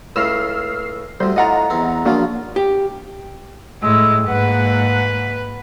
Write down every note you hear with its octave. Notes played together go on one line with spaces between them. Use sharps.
C#2 A2 C#3 E6 F6 C7
D2 C3 G3 C5
A2 D4 F4 D#5 F#5 A#5
E2 C4
C#3 F3 A#3 D4 F4 F#4
G4
A2 G#3 E6
G#2 A#3 B4 F#5